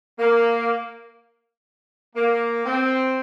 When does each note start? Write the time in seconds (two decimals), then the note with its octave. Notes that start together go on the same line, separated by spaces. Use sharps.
0.19 A#3
2.16 A#3
2.66 C4